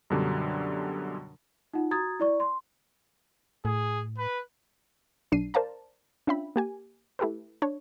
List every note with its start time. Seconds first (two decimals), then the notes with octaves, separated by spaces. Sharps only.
0.10 F#2 B2 D3 F#3 G3 D4
1.74 D#4 F4 F#5
1.91 F#4 A#5 D#6 G#6 A6
2.20 E4 D5 C#6
2.40 C6
3.65 A2 G#4
4.18 B4
5.32 B1 D4 C7 D#7
5.54 A#4 C5 D5 F5 A5 A#5
6.27 C#4 D4 F4 E5 G5 B5
6.56 A#3 G4 G#5
7.19 A3 E4 G4 A4 B4
7.62 D4 C#5